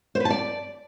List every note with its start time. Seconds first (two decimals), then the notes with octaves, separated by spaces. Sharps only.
0.15 C5
0.20 B4
0.25 A5
0.30 D5